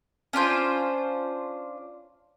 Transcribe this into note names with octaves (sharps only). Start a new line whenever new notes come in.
C#4 D4 F4 C5